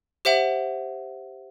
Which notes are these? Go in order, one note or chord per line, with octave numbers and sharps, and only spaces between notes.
G4 C5 E5 F#5 F#7